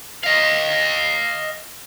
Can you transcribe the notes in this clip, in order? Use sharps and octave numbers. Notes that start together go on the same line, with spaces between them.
D#5 F5